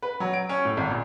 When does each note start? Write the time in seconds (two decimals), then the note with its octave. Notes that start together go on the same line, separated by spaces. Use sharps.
0.02 B4
0.20 F#3
0.33 D7
0.49 C#4
0.65 A2
0.77 G#1
0.90 A#2